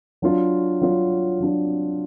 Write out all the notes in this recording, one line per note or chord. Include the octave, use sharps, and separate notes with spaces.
F#3 D4 F4
F#3 D4 F4
F#3 D4 F4